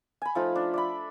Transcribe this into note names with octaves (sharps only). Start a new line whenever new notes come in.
G#5 B5
F3 A3 D#4 F4
D4
D5 E5 B5